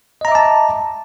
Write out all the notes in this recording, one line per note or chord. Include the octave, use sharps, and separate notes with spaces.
D#5 E5 A5 A#5 D6